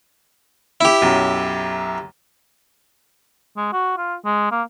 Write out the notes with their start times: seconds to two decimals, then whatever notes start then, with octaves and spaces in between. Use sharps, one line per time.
0.81 E4 G4
1.02 B1 F#2
3.57 G#3
3.73 F#4
3.98 F4
4.25 G#3
4.51 A#3